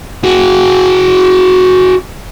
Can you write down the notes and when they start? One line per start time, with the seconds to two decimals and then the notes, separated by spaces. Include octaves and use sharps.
0.24 F#4 G#4